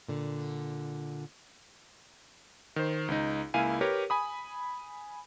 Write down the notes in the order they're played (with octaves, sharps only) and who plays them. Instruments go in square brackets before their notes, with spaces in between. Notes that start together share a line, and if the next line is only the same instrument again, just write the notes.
[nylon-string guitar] A#2 D3
[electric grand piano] D#3 C5
C#2 D#4
C#2 A#3 E4 F5 G#5 D#7
G4 A#4 B4 C#5
G#5 B5 D#6